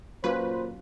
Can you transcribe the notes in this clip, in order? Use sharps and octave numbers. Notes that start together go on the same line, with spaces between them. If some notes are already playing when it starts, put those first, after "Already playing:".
A#2 F#3 C#4 F4 B4 C5